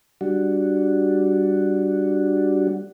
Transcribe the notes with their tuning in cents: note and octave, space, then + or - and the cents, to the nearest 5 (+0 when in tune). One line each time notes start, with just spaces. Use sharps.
G3 +0 D4 +0 F#4 +0